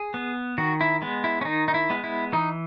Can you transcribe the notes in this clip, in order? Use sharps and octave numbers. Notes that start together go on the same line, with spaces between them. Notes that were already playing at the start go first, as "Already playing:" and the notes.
Already playing: G#4
B3
D#3 F#4
E4
G#3 B3
E4
C#4
D#3 D#4
D#4
E4
G#3 B3
E4
E3 D#4